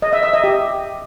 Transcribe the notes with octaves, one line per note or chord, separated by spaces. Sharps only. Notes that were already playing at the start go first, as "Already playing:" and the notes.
D#5
E5
E5
D#5
G4